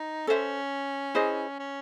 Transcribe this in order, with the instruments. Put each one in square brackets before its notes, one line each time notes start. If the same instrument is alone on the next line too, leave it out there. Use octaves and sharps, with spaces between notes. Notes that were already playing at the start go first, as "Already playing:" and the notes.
Already playing: [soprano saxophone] D#4
[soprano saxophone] C#4 [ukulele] A4 C5 E5
[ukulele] E4 G#4 C5 D#5
[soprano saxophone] C#4